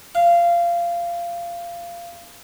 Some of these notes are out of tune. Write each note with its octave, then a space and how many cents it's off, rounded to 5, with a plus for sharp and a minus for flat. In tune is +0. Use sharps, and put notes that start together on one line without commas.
F5 -20